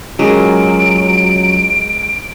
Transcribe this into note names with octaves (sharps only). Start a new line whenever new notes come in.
F#3 G#3 C#4 F4 F#4 A#4 D7